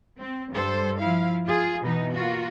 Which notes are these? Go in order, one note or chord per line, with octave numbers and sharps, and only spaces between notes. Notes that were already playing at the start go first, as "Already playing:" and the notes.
C4
G2 G3 A4 C5
F3 E4 F5
F4 G#4
B2 E3 B3 D#4
A#3 F4 F#4